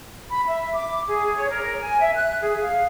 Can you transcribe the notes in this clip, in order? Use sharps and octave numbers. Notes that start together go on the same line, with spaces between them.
B5
E5
D6
G#4
C#5
A#4
G#5
E5
F#6
G#4
F5